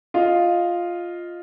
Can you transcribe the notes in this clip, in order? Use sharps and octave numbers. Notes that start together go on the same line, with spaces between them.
F4 D#5 F5